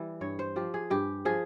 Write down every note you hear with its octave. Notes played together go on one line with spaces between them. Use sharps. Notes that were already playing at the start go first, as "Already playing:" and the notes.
Already playing: E3 G3
G2 C#5
C5
F3 G4
G#4
G2 G4
F3 G#4